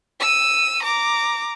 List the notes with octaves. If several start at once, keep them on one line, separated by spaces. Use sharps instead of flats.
E6 D#7
A#5 D6